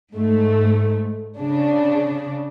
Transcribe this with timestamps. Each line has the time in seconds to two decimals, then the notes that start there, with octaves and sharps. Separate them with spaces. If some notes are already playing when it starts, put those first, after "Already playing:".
0.13 G#2 A3
1.39 C#3 D4